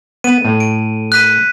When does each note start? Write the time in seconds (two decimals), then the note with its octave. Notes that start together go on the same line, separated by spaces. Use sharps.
0.24 B3 D#7
0.45 A2
0.60 D7
1.12 F#6 B6 D#7